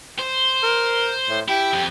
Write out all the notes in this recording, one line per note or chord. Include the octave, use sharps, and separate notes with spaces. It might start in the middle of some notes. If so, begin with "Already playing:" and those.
C5
A#4
A2
E4 G4
F2